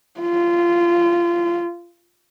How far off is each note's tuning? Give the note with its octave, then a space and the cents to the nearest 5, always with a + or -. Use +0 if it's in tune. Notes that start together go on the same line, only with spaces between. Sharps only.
F4 -20